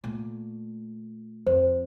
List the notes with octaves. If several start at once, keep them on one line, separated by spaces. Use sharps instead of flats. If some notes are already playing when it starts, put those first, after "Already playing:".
A#2 A3
F2 C5